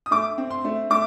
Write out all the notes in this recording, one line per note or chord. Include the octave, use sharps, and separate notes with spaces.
D#6
A3 D6
C4
C6
A3
A3 D6